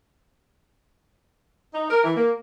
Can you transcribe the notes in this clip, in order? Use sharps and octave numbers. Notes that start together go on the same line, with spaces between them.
D#4
A#4
E3
A#3